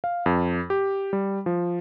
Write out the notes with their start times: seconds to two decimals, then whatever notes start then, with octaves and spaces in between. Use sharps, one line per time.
0.04 F5
0.26 F2
0.70 G4
1.13 G3
1.46 F3